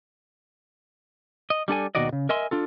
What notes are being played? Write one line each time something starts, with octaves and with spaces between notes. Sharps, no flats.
D#5
G3 D4 A4 G#5
D#2 B2 D#3 F#4 D5 D#5
C#3
A#4 D#5 E5 G#5 C6
D4 F4 A4